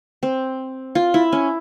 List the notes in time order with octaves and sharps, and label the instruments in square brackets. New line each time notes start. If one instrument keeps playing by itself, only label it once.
[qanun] C4
F4
E4
C#4